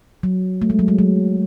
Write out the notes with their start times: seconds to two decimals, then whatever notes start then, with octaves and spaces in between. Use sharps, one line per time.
0.23 F#3
0.62 A3
0.70 G#3
0.79 F#3
0.88 G#3
0.99 F#3